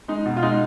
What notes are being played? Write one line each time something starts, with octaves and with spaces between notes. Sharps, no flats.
G#3 D#4
B2
F4
G#3 D#4